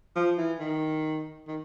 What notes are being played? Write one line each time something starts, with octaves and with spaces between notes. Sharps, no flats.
F3
E3
D#3
D#3